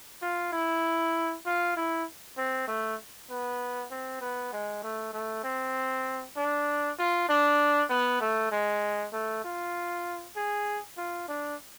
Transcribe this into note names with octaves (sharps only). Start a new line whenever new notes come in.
F4
E4
F4
E4
C4
A3
B3
C4
B3
G#3
A3
A3
C4
D4
F4
D4
B3
A3
G#3
A3
F4
G#4
F4
D4